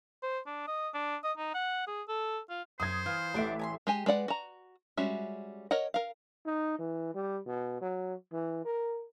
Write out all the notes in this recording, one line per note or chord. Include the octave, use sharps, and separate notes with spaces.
C5
D4
D#5
D4
D#5
D#4
F#5
G#4
A4
F4
F#2 C5 D#6 G#6
E3 F4
A1 A3 D4 E5 F#5 D6
G#5 A#5 C6
G#3 G4 G#5
G#3 B4 D5 F#5
F#4 A#5
G3 G#3 C#4 F#4 E5
A#4 C#5 D#5 F#5
A#4 F5
D#4
E3
G3
B2
F#3
E3
A#4